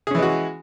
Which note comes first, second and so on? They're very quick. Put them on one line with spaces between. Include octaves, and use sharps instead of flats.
G#4 C#4 E3 G#3 F#4